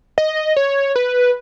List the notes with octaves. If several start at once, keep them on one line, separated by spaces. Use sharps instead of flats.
D#5
C#5
B4